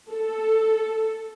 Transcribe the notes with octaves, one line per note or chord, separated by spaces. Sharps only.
A4